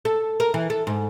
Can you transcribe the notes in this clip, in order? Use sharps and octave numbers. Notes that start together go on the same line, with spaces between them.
A4
A#4
E3
A4
G#2